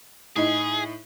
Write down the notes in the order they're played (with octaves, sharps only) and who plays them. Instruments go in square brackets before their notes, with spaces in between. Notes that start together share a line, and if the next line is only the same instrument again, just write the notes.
[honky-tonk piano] A2 D#4 [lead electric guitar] G#4